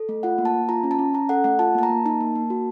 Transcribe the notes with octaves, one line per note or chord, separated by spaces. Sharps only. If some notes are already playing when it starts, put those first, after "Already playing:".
Already playing: A4
A3
F4 F#5
A#3
A5
A#3
F4 A#5
C#4
A5
C#4
C#4 A#5
A4 F#5
A3 F#5
F4 A5
A#3 A5
A#5
A#3
D#4 A5
A#3
A#3
F#4